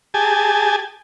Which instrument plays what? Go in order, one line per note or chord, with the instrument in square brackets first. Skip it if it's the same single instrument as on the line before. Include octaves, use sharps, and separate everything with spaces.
[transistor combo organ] G4 G#4 G#5 A5